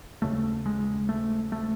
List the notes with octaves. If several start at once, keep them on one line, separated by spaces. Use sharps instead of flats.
D#2 C#3 A3
G#3
A3
A3